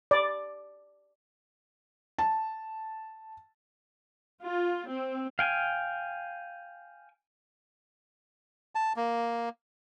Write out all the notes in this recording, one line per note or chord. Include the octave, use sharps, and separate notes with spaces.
D5
A5
F4
C4
F5 G5 G#5
A5
A#3